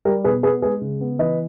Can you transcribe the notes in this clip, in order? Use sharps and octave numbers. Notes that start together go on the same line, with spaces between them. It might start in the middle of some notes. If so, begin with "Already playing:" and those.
G3 G4 A#4
B2 G#4 B4
B3 G#4 B4
G#3 G#4 B4
C#3
B3
E3 B4 D#5